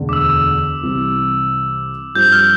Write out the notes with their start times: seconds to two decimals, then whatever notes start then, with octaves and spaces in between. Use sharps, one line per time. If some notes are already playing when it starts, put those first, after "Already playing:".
Already playing: E1 D2 D3
0.09 D6
0.13 E6
0.81 C2 C3 E3
2.15 G2 F3 C4 G4 G6
2.32 F6